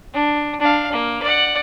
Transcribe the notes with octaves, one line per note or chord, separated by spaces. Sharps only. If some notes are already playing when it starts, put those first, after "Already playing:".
D4
D4 F5
A#3
D5 F#5